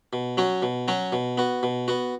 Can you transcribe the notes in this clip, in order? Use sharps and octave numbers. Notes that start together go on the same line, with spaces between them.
B2
F#3 C#4 F#4
B2
F#3 C#4 F#4
B2
B3 F#4
B2
B3 F#4